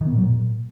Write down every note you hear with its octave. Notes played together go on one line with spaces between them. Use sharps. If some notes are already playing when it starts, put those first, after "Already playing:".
D#3
B3
A#2
F#3
A#2